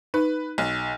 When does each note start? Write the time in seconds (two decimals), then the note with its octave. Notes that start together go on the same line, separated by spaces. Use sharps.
0.14 D#4 B4
0.58 B1